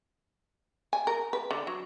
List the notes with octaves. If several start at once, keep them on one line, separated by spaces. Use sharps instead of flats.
G#5
A#4
B4
D3
F#3